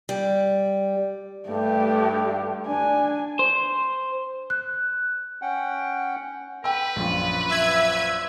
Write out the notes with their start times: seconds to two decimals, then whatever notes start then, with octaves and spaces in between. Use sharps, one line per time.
0.09 G3
1.49 G2 A3 G4
2.68 D4 G#5
3.39 C5
4.50 F#6
5.42 C#4 F#5 G5
6.64 B4 G5 E6
6.96 A#1 F#2 F4
7.48 E5 G#6